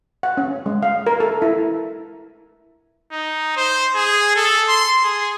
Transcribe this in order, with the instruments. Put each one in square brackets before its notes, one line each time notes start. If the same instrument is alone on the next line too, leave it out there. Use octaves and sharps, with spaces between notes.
[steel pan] F#5
C#4
G#3
F5
A#4
A4
E4
[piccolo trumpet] D#4
C5
G#4
A4
C6
G#4